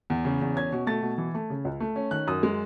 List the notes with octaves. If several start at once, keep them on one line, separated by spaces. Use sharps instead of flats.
E2
C#3
E2
C#4 G#6
B2
A3 A6
B2
E3
A3
C#3
C#2
A3
C#4
D#3 F#6
F#2 D#6
G#3